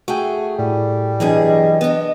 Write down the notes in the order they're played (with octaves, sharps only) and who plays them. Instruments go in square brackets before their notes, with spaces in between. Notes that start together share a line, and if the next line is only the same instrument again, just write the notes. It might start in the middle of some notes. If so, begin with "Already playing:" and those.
[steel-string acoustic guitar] A3 G#4 [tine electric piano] F#4 G5
[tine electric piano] A2 [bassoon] G3
[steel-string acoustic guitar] G2 B2 G#4 [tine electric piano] E3 F#3 D4 [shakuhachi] D#5
[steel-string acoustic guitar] B3 D4